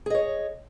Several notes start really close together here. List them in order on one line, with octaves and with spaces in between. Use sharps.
G#4 D#5 C#5